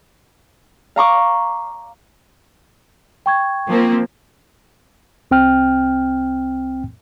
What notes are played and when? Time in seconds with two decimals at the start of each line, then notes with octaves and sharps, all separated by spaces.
0.96 F5 A#5 C#6 D6
3.26 G5 C#6 G#6
3.69 F3 A#3 C4
5.31 C2 C4 G5 F6